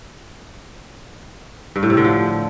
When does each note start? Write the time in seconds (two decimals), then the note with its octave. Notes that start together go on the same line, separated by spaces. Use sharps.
1.76 G2
1.83 A2
1.90 C3
1.97 D3
2.04 F3